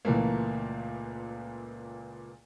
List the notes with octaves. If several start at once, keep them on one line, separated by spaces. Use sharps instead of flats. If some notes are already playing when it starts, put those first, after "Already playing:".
C#2 A#2 E3 A3 A#3